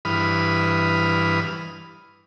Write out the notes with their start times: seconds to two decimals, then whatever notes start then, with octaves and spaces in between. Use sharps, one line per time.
0.05 G2 E3 B4 B5 D#6 F6